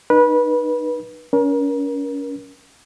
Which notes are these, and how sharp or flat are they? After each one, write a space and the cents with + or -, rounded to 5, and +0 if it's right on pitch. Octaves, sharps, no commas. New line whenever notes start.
D#4 -30 B4 -25
C#4 +30 A#4 +35